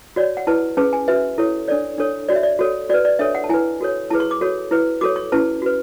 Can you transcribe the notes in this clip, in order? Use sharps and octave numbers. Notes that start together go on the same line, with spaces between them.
F#4 C#5 D5
F#5
E4 B4 A5
C#4 G#4 B4 A5
G#5
F#4 B4 E5
E4 A4 C#5
D4 A4 C#5 D5
D4 A4 C#5
F#4 C#5 D5
E5
D5
F#4 A4 C#5
F#4 B4 D5
D5
D4 A4 C#5 E5
F#5
A5
E4 B4 G#5
F#4 A4 C#5
E4 G#4 B4 A5
C#6
D6
F#4 A4 C#5
E4 B4
F#4 A4 C#5 D6
C#6
C#4 E4 B4 A5
F#4 B4